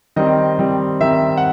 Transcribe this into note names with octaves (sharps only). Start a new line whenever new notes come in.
D#3 G3 C4 D#5
D#3 G3 C4
D#3 G3 C4 E5
F#5